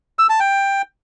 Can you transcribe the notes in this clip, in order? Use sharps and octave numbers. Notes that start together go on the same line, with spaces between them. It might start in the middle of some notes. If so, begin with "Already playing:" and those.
E6
A5
G5